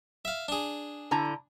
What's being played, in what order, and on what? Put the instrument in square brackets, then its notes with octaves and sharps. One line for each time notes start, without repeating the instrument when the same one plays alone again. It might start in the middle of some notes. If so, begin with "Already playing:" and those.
[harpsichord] E5 F5
D4 G#4
[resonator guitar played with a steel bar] D3 E4 A#5